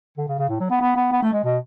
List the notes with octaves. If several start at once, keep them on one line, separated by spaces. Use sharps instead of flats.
D3
C#3
C#3
A2
F#3
B3
B3
B3
B3
A3
G#3
B2